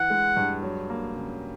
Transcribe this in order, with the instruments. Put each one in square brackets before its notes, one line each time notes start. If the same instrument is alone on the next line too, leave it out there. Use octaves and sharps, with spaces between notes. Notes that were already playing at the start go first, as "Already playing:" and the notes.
Already playing: [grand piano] E3 [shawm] F#5
[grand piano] G#3
G2
F#3
A#3
C#3